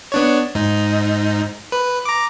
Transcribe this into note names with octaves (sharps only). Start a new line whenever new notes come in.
B3 D4 C#5
G#2 D#4
B4
A#5 D6